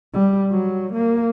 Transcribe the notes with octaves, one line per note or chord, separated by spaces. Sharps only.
G3
F#3
A#3